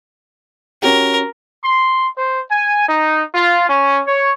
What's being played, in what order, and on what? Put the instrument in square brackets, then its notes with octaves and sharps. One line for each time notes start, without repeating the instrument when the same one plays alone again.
[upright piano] C#4 F#4 G4 [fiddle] A#4
[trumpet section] C6
C5
G#5
D#4
F4
C#4
C#5